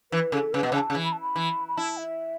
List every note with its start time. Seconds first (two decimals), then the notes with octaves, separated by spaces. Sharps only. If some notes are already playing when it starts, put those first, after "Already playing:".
0.12 E3 B4
0.32 C#3 A4
0.53 C#3 B4
0.63 B2
0.72 C#3
0.74 A5
0.90 C#3
0.95 E3
1.04 B5
1.12 A5
1.21 B5
1.36 E3
1.68 B5
1.77 E4 A5
1.97 E5